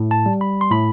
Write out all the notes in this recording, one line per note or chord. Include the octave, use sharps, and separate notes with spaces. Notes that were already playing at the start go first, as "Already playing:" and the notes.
Already playing: A2
A5
G3
B5
C6
A2 B5